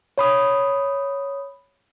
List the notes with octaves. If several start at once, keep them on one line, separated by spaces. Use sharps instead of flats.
C#5 B5 D#6